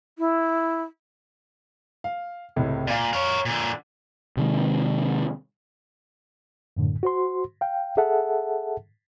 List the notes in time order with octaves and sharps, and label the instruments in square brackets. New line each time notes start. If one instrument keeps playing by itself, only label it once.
[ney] E4
[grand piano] F5
C#2 A2 C3
[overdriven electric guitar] A#2 [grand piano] D5 F5
[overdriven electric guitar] A#4 C#5
A#2 D3
[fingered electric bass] C3 D#3 G#3
[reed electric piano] F#2 A2 D3
F#4 C5 C6
F5 G5
G#4 A4 E5 F#5 A5